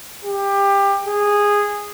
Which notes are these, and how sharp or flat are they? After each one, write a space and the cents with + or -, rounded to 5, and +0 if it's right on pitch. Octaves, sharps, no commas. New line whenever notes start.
G4 +20
G#4 -10